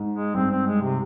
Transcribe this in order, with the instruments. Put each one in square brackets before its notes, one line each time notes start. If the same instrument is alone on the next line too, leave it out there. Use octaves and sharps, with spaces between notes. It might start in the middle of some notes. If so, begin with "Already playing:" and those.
Already playing: [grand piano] G#2
[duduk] G#3
[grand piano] G2 [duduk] C4
[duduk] C4
G#3
C3